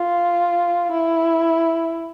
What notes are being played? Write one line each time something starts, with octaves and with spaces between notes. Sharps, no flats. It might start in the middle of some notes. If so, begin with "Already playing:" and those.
Already playing: F4
E4